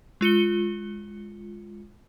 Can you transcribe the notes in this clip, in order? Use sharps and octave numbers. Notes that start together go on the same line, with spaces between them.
G#3 F4 C#7 G7